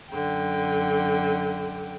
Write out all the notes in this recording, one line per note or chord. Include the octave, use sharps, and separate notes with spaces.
F#2 D3 G5